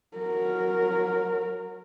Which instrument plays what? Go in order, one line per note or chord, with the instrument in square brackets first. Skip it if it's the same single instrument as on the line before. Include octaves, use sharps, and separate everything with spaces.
[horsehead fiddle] F#3 A#4